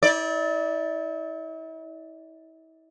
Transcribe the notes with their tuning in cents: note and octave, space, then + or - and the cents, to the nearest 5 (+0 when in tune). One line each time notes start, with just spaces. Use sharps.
E4 -40 D5 +0